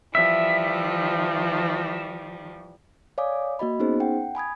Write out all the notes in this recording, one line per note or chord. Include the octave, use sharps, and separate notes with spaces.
E3 F3 G3 E5
C#5 D5 F5 G#5 D6 D#6
A#3 F#4 D#5 B5
B3 C#4 D#4 G#4 C5
F#5 G5
G#5 B5 D#6 G#6